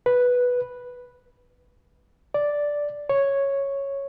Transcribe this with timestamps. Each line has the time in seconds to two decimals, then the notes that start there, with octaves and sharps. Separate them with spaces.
0.06 B4
2.34 D5
3.09 C#5